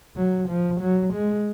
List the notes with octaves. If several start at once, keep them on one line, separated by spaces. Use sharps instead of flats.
F#3
F3
F#3
G#3